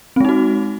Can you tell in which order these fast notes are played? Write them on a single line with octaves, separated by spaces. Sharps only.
C4 G#3 D#4 F#4